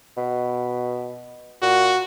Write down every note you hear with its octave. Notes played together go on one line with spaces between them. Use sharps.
B2
A#2 F#4